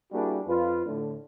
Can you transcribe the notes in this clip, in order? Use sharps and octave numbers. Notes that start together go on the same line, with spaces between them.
G3 A#3 D4 E4 F#4 G#4
F2 F4 B4
A2 D3